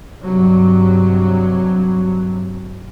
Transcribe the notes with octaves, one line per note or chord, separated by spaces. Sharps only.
G2 C3 F#3